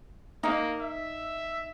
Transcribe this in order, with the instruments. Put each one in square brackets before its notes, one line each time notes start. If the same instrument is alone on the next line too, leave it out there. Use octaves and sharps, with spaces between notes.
[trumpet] A#3 [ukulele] D#4
[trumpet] E5